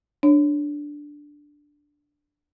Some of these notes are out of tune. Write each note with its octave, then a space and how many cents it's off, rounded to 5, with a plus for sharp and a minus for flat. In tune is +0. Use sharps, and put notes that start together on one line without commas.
D4 +0 C#5 +0